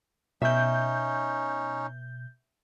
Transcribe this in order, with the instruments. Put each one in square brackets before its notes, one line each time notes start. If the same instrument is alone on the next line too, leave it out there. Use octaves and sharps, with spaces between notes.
[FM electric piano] B2 G6 [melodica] C#4 D#4 [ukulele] E5